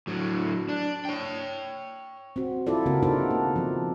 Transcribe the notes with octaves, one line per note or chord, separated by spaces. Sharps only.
A2 F#3
D4
C#5 G5
C4 F#4
E4 F4 A4 D5
C#3 A#3 C4 F#4 A#4
B3 D4 D#4 A4 A#4 C5
A#3
F3 C4